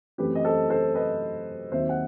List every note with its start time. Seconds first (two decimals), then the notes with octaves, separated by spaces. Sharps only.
0.18 F#2 E3 A3 C4 G4 B4
0.35 D#5
0.45 A4 C5
0.70 A4 C5
0.95 B4 D#5
1.72 D#2 D#3 F#3 C4 C5 E5
1.89 F#5